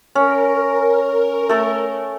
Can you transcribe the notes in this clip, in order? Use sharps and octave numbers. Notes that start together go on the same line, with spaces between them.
C#4 A#4
A3 A4